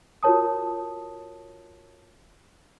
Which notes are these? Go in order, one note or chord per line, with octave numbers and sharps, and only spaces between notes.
F4 F#4 A#4 C#5 A5 D#6